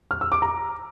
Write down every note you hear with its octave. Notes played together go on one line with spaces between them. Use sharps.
F6
E6
D6
A#5